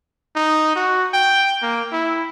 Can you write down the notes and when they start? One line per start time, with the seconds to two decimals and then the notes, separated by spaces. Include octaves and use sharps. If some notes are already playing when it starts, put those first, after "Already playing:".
0.36 D#4
0.76 F#4
1.14 G5
1.63 A#3
1.92 E4